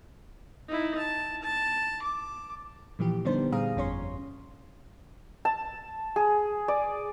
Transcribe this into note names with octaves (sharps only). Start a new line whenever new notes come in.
D#4 E4
A5
A5
D6
A#2 E3 F3 G4
D3 G3 B3 D4 D#4 C5
A#2 G3 G#4 F5 A#5 D#6
G1 F2 F3 C#4 C#5 C6
A5
G#4
D5